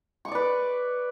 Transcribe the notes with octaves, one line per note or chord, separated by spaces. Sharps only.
B4 D5 C#6 D6